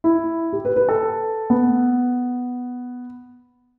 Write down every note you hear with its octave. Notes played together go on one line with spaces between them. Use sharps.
E4
G4
B4
B4
A4
B3